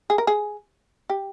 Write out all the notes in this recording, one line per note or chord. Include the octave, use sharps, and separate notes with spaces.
G#4
A#4
G#4
G4